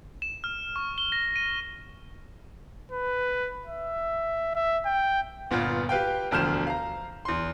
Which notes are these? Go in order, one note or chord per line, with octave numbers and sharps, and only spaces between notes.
E7
F6
C#6
G7
A#6
D#7
B4
E5
E5
G5
G1 A#2 B3 F4
G4 B4 F5 G5
E1 D2 F3 F6 G6 E7
F5 A#5
E2 C6